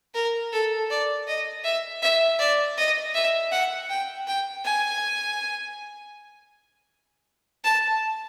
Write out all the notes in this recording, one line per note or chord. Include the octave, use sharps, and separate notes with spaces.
A#4
A4
D5
D#5
E5
E5
D5
D#5
E5
F#5
G5
G5
G#5
A5